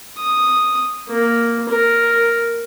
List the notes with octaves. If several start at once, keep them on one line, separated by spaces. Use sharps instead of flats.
D#6
A#3
A#4